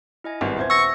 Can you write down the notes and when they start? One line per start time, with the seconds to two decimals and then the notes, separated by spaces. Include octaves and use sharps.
0.24 E4 D#5 G#5
0.41 G#1 G2 B3 B4
0.56 D#1 C5 E5 G#6
0.70 C#6 E6 A#6